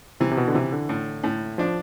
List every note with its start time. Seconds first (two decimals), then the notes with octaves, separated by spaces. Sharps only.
0.20 C3 E3
0.31 C3
0.37 B2
0.48 D3
0.55 C3 E3
0.72 D3
0.89 A2
1.23 A2
1.58 F3 D4